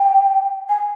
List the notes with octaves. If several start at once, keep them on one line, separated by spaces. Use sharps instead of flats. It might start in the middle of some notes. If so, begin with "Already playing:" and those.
Already playing: G5
G#5